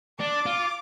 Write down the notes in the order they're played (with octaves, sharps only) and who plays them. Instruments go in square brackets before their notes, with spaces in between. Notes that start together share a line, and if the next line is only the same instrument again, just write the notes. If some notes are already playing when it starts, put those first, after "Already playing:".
[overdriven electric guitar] D4 [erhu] D6
[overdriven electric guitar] F4